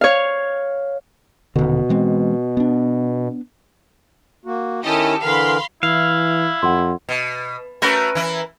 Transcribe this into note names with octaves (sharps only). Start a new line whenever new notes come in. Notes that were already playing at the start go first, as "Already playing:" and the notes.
C#5 F5
D#1 B2 D3
E3 G#3 C4
B3 D4
A#3 F#4
D#3 C#4 E4 G4 A4 D#5
D3 E3 A#4 F5 B5 C6
E3 E4 F5
F2 F#5 C6
B2
A3 C#4 F#4 A#4 B4
E3 E4